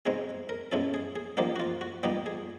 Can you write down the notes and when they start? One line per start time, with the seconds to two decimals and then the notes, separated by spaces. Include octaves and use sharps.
0.06 B2 G#3 C4 D#4 G#4
0.49 A#4
0.72 B2 G#3 C#4 E4 A4
0.94 G#4
1.16 G#4
1.37 D3 F3 A#3 D#4 G4
1.56 F#4
1.60 F4
1.81 F#4
2.03 A#2 G3 B3 D#4 G4
2.26 G#4